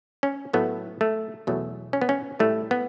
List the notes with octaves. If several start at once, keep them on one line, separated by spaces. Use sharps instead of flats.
C#4
A2 F#3 A3 B3
A3
E2 B2 F#3 A3
C#4
B3
C#4
A2 G3 A3
B3